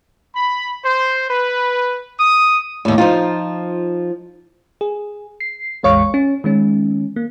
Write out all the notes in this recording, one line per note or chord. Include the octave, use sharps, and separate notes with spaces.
B5
C5
B4
D#6
D#2 A2
F3 D#4 F4
G#4
C7
A1 E2 G#3 C#5 F5 C#6
C#4
D#3 G#3 C#4
A#3